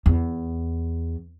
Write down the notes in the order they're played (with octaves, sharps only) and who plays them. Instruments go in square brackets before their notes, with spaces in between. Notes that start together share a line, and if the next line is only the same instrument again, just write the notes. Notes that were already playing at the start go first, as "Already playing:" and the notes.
[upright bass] E2